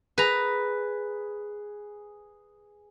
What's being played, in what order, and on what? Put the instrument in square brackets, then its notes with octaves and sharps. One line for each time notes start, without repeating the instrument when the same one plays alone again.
[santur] G#4 [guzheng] B4 A#5